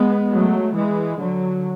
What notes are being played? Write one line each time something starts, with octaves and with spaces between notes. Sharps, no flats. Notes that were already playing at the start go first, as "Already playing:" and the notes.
Already playing: G#3 B3
F#3 A3
E3 G#3
D3 F#3